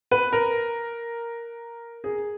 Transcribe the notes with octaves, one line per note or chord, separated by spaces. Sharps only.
B4
A#4
G#4